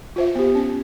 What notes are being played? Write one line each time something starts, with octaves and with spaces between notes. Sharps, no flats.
F4 C5 E5
B3 G4
C#4